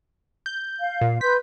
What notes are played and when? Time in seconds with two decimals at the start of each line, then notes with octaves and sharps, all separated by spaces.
0.46 G6
0.79 F5
1.01 A#2
1.21 B4 C6 G6 B6